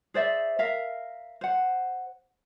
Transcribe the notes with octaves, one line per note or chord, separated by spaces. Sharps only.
G#4 C5 D5 E5
A#4 E5 F5
C5 F#5